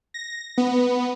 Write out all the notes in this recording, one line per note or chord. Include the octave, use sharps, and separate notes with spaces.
A#6
B3